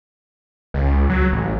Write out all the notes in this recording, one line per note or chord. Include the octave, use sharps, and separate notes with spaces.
C#2
F#3
A1